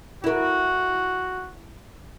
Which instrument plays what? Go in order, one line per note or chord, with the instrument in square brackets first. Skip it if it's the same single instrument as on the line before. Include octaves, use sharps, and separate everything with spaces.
[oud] E4 A#4 [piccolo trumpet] F#4